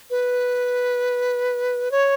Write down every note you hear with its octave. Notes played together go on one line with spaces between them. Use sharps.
B4
C#5